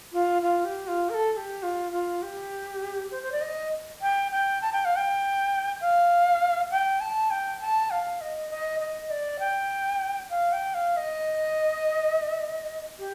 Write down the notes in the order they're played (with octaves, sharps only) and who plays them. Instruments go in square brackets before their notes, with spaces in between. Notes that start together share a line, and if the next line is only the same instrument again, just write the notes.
[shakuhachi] F4
F4
G4
F4
A#4
A4
A4
G4
F4
F4
G4
C5
C5
D5
D#5
G5
G5
A5
G5
F5
G5
F5
G5
A5
G5
A5
F5
D#5
D#5
D#5
D5
G5
F5
G5
F5
D#5
G4